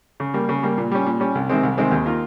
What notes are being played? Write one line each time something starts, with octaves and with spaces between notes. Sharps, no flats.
C#3
G3 A#3
C#3
G3 A#3
A#2
G3 C#4
A#2
G3 C#4
C2
C3 D#3 G#3 C4
C2
C3 D#3 G#3 C4
D#2
D#3 A#3 F4 A#4